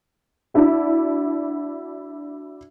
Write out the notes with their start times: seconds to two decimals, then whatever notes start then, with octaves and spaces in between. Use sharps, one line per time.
0.54 D4 E4 F#4